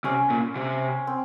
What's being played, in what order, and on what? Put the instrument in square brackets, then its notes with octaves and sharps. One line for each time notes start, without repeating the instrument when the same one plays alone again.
[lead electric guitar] C3 [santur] C#4
[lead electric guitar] A#2
C3
[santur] C4